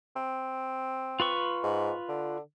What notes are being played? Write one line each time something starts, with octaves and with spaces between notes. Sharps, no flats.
C4
F4 B4 C#6
G#2
D3